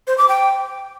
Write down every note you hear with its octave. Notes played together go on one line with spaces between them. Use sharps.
C5
D6
G5